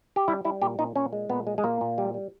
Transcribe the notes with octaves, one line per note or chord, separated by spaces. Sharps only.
G4
G3 E4
G3 E4
A#2 G4
A#2 D#4
A#2 C#4
G#3
A#2 B3
G#3
G#3
A#2 A#3
A#2
G3
G3